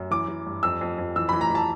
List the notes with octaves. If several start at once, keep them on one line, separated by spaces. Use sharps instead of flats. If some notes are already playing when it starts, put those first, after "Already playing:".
Already playing: F#2
E3 D6
E3
G2
F2 E6
F2
F2
E3 E6
B5
E3
A#5
E3 A5